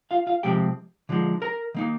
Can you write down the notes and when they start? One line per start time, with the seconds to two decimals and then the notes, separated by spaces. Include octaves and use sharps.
0.11 F4 F5
0.27 F4 F5
0.43 C3 F3 G#3 C4 G4 G5
1.09 D3 F3 G#3 D#4
1.42 A#4 A#5
1.75 D#3 A#3 D#4